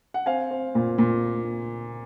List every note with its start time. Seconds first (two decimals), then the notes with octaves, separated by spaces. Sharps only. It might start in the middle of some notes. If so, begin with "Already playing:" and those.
0.14 F#5
0.26 C4 F5 G#5
0.51 C4
0.75 A#2
0.98 A#2